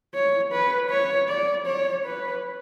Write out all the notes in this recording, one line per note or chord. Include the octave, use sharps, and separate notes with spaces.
C#5
B4
C#5
D5
C#5
B4